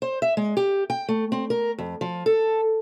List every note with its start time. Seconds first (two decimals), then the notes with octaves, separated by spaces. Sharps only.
0.02 C5
0.22 E5
0.37 G#3
0.57 G4
0.90 G5
1.08 A3
1.32 C4
1.50 A#4
1.78 F2
2.01 F3
2.26 A4